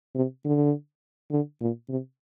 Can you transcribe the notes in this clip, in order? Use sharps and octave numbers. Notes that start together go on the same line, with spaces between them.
C3
D3
D3
A#2
C3